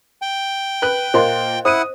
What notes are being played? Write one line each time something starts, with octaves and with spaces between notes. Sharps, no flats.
G5
B4 F#6
A#2 A#3 C5 D#5 C6
E4 C5 F#5 D#6 D#7